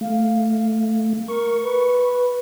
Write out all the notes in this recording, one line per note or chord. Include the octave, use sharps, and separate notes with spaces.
A3 F5
A#4 C#6
B4